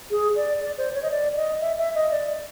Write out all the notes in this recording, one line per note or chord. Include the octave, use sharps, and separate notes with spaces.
G#4
D5
D5
C5
C#5
D#5
D5
D#5
E5
E5
D#5
D5